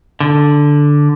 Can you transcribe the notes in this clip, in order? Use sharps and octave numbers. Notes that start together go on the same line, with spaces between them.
D3